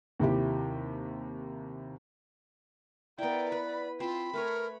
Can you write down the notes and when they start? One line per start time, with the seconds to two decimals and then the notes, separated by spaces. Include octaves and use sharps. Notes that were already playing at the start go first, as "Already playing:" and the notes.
0.19 D#2 C3 E4 G4
3.18 B3 E4 A#4 D5 G5
3.52 B4 B5
4.00 C4 F4 B5
4.34 A3 A#4 B4 C#5